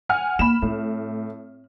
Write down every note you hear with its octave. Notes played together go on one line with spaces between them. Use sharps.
F#5 G#5 F6
A#3 B5 E7
A2 C4